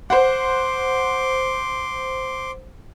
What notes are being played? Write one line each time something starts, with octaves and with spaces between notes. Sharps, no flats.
C5 F#5 C6 D6